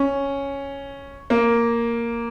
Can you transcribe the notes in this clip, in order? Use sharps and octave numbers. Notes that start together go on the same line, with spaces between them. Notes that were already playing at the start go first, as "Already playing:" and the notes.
Already playing: C#4
A#3